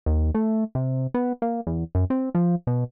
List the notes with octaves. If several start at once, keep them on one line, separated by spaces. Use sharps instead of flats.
D#2
A3
C3
B3
A#3
E2
F#2
C4
F3
B2